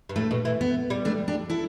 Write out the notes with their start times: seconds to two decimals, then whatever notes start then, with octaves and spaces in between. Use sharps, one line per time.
0.09 G2
0.16 A2 A3
0.31 B2
0.45 E3
0.61 B3
0.90 G3
1.05 A3 D4
1.28 D4 G4
1.50 E4 A4